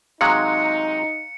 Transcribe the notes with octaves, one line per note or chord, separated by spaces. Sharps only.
C3 F#3 G#3 D#4 F5 A#5 F#6 C#7